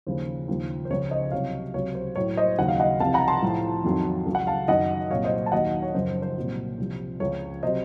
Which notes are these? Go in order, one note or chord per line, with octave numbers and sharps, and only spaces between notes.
D#2 C#3 F3 C5
D#2 C#3 F3
C5
C#2 C#3 F3 C#5
C5 D#5
C2 C3 F#3 C#5 F5
C#2 C3 F#3 C#5
C5
A2 F#3 C#5
C5 D#5
D#2 C#3 F#3 F#5
F5
D#5 F#5
C2 C3 F3 F5 A5
F#5 A#5
A5 C6
A2 F3
F2 D#3 F#3
C#2 C#3 F#3
F#5
F5 A5
F#2 D#3 F#3 D#5 F#5
C2 A#2 F#3 C#5 F5
C5 D#5
A5
D#2 D#3 F#3 D#5 F#5
C#5
F#2 C#3 F3 C5
C5
C5
C2 A#2 F#3
C2 C3 F3
C#2 C#3 F3 C#5
C3 F#3 C5 D#5